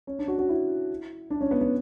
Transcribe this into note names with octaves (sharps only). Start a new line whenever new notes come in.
C#4
D4
F#4
F#4
E4
D4
C#4
B3
B3